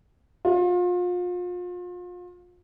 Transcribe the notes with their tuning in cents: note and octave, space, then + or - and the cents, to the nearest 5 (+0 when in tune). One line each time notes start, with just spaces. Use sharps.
F4 +35